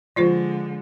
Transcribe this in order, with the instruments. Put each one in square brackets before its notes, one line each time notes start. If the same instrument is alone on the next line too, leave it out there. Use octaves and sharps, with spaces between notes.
[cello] D3 G#3 [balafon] F3 F4 C5